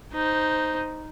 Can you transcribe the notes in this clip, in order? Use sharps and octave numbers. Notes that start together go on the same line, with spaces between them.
D#4 C5